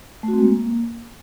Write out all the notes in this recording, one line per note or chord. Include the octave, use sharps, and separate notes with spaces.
A3
F#4
C4
G#3
A#3